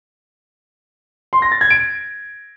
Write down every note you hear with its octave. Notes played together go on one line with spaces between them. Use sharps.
C6
A#6
A6
G#6
D7